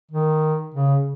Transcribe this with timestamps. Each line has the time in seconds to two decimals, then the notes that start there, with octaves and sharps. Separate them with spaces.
0.11 D#3
0.74 C#3